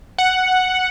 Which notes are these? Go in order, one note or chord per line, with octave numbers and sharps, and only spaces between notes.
F#5